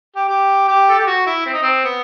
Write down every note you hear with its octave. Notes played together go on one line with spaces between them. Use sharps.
G4
G4
G4
A4
G4
F#4
E4
C4
D#4
C4
B3